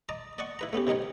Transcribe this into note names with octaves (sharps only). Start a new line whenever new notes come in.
D#5 A5 A#5 D6
D5 D#5 F#5 A5 C#6
E4 B4 A#5
A3 B3 C#4 G4
C3 D#3 D#4 A#4 C#5